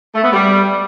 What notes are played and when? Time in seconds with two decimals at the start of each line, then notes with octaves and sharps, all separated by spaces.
0.15 A3
0.24 B3
0.33 G3